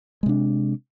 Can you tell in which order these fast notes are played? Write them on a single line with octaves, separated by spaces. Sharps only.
G#3 C3 D4